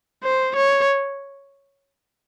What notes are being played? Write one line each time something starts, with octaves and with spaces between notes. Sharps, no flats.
C5
C#5